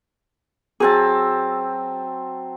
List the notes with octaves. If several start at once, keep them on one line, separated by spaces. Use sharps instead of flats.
F#3 C4 G#4 A5